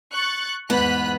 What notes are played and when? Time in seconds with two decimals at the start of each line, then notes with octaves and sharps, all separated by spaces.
0.12 C#6 F#6 A6
0.70 E2 G#2 B3 B4 B5 F#6